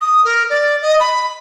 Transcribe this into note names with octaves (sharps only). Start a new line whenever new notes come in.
D#6
A#4
D5
D#5
B5